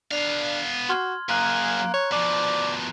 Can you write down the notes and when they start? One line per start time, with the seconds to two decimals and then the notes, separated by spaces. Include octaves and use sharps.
0.12 B3 D4 F5
0.89 F#4 C6 F6 G#6
1.29 F#2 A#3 G#4 A#5 F#6
1.94 C#5
2.12 B2 F3 D5